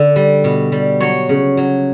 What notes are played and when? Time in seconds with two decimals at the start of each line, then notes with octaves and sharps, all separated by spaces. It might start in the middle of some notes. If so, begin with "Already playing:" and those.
Already playing: D3
0.16 G3
0.44 B2
0.72 G3
1.00 F#3 C#5
1.29 C#3
1.57 F#3